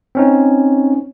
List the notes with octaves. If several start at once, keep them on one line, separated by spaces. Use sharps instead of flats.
C4 C#4 D#4